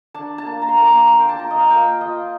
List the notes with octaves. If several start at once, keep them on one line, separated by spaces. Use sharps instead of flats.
D4 A5
A5
A#3
A#5
C6
A#3 A#5
D6
A#3 C6
G5
A5
F4 A#5
D#5
F5
A#3 G5
F4 D#5